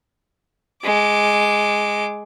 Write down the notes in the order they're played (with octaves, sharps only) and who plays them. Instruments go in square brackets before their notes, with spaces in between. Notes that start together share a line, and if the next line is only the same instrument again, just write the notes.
[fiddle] G#3 D6